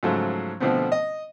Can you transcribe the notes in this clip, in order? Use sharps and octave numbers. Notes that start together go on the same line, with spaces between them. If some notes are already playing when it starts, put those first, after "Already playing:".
G#2 C#3 F3 F#3 A3
B2 D3 F3 A3 B3 C4
D#5